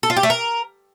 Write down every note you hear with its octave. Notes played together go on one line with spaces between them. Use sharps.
A4
F4
G4
A3
A#4